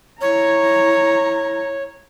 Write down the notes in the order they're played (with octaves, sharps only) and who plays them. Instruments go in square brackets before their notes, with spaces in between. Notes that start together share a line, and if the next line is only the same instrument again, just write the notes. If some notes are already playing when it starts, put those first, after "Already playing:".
[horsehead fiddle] E4 A#5 [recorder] C#5